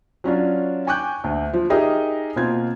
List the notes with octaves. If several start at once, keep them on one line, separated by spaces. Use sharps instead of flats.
F#3 C#4 D4 F4
G5 G#5 C#6 D6 F#6 G6
D2
F3
D#4 G4 G#4 A#4 D#5 E5
B2 A#3 C4 F4 G#6